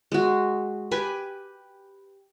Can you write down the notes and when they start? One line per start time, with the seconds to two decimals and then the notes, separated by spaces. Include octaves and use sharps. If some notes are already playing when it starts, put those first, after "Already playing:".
0.12 G#3 F#4
0.91 G4 B4 G#5